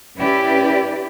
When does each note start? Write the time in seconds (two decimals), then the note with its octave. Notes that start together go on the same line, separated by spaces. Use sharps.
0.17 C#4 E4 G4 B4 D5